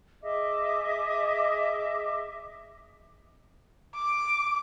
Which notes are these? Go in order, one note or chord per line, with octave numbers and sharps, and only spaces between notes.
G#4 D#5 E5 D6
D6